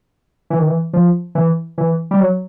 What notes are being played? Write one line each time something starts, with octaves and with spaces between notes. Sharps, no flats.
E3
D#3
E3
F3
E3
E3
G3
F#3